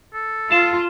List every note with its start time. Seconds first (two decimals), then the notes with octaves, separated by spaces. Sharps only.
0.14 A4
0.52 F4 A5